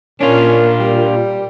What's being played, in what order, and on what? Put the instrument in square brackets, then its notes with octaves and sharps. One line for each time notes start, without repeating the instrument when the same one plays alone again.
[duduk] A#2 [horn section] C#4 [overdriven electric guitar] D4 F4 [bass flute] A#4
[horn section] G3